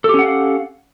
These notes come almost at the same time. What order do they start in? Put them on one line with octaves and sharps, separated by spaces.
A4 G4 C#4 F#5 F5